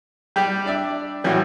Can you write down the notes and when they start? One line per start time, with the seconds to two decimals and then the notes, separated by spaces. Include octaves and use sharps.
0.36 G3 G4 D5 G5
0.66 D4 D5 E5
1.24 A2 E3 G3 C#4 F#4